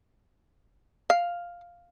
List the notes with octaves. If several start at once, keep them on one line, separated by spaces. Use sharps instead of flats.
F5